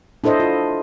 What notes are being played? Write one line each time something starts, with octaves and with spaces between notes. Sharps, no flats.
D4 E4 A4 C5 D#5
F4